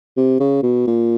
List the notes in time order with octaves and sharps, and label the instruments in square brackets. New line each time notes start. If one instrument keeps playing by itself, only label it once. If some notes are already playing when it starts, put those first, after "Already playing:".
[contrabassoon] C3
C#3
B2
A#2